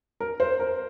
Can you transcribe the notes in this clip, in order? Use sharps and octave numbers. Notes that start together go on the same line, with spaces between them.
A#4
C5
A#4